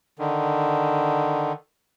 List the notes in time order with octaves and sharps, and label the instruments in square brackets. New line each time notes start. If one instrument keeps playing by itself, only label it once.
[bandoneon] D3 D#3